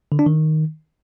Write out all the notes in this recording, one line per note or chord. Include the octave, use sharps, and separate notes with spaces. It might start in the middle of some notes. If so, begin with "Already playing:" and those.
D3
D4
D#3